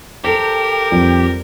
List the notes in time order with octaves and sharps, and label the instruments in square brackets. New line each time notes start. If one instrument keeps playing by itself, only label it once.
[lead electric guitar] G4 [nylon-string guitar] A4 C5 [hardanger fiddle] A#4
[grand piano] F2 [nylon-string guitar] G3